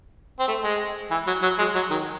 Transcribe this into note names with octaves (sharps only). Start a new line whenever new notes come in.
C4
A3
G#3
E3
F#3
F#3
G#3
F#3
D#3